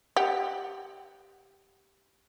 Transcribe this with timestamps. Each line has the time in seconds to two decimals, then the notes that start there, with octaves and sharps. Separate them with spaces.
0.16 G4 F#5